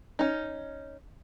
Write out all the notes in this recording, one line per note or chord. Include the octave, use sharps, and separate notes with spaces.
C#4 D#4